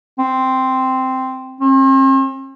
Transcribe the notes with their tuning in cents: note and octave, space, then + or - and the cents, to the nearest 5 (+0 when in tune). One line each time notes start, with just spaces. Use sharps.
C4 -5
C4 +45